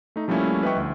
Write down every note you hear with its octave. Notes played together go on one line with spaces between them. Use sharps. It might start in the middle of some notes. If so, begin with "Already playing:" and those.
A3 D#4
F3 G3 A3 A#3 C#4 E4
B4 D#5 E5 G5 C#6
D2